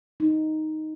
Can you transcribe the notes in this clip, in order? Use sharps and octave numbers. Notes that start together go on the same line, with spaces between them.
D#4